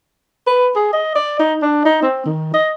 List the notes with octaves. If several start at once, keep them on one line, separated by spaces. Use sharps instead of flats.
B4
G#4
D#5
D5
D#4
D4
D#4
C4
D#3
D#5